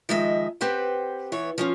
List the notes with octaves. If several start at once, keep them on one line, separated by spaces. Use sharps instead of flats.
D#3 F3 G#3 D#5 E5
C4 G4 B4 C5 F#5
E3 B3 C#5
F3 C#4 F4